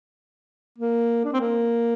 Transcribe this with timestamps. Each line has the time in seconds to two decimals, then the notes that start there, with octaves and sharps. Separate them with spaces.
0.78 A#3
1.25 D4
1.33 C4
1.40 A#3